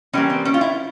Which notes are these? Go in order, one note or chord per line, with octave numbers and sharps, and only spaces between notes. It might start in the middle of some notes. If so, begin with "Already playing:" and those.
E3 G3 A#3 C#4
C4
C#4
F4
E4